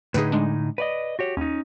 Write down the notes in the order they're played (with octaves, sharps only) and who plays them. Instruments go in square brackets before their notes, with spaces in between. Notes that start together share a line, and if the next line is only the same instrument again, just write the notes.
[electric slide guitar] A2 D3 D#4 [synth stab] G#4 B4
[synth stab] G#3 D4
[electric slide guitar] B4 D5 D#5
F#4 G4 C#5
[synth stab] D#2 [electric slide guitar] C#4 D#4